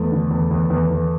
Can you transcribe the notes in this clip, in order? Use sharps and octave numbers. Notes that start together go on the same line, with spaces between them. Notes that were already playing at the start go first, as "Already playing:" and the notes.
Already playing: E2 A3
D3
E2
E2
E2
E2